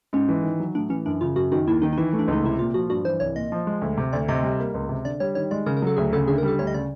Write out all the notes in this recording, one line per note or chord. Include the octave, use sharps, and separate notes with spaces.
G#2 C#4
E3
D#3
F#3
A2 D4
E3 C#4
F#2 D4
C#3 F4
F#2 F#4
D#3 F#4
D#2 E4
D#3 D#4
D#4
E3 E4
A3
D4
C#2 D#4
C3 E4
A#2 F4
F3 F#4
G2 F#4
E3 C5
C2 C#5
A#2 D#5
F3
G#3
D2
C3
D2 D5
C3 D#5
G3
A#3
C#2
C3
D3 D5
G3 C#5
D#3 C#5
G#3 D5
C#3 A#4
A#4
F#3 A4
D2 G#4
C#3 A4
D3 G#4
A#4
G3 A4
D2 C#5
D#5
C#3 D5